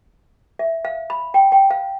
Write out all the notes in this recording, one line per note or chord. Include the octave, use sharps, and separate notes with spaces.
E5
F5
B5
G5
G5
F5